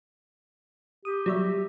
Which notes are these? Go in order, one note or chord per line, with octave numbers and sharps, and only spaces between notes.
G4 D#6
F#3 G3 E5